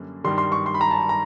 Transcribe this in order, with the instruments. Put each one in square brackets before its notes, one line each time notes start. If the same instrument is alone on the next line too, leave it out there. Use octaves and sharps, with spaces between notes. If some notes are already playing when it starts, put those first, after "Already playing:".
Already playing: [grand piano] F#2 D3 G3 A#3 C#4
G2 D#3 G3 C6
C6
C#6
C6
B5
A#5
A5
A#5